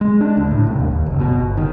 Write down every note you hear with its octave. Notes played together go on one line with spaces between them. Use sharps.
G#3
D4
D2
A2
C2
D#2
D#2
F#1
B2
G1
D#3